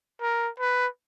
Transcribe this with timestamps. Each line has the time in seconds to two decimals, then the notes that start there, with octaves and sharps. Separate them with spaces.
0.22 A#4
0.60 B4